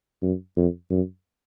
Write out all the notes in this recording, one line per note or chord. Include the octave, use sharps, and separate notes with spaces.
F#2
F2
F#2